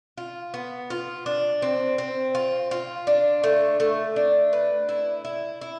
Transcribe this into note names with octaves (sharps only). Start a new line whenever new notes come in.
F4
B3
F4
D4
C4
C4
F4
F4
D4
A3
A3
D4
B4
E4
E4
E4